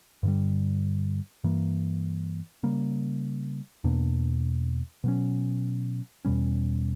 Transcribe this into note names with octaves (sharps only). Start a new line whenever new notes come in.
G2 D3 G3
G2 E3 A#3
C#3 G3 A#3
E2 B2 A#3 D4
B2 F#3 C#4
E2 B2 G3 C#4